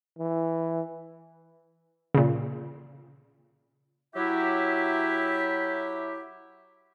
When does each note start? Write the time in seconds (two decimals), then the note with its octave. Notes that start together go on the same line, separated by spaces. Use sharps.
0.19 E3
2.14 A#2 C#3
4.15 F#3 E4 G4 E5